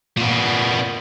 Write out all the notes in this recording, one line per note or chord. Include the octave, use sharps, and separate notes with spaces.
A#2 B3